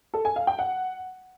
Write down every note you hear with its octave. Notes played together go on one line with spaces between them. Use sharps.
A4
G#5
F5
G5
F#5